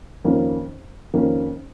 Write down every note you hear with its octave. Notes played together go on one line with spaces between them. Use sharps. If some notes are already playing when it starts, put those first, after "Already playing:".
F2 D#3 A#3 C#4
F2 D#3 A#3 C#4